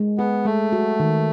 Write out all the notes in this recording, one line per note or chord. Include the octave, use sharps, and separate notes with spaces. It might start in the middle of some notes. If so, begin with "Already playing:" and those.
Already playing: G#3
B3 G#4
G#3 A3
F#4
D#3